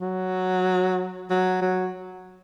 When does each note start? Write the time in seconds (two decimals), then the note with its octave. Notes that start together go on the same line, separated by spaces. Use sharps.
0.01 F#3
1.30 F#3
1.62 F#3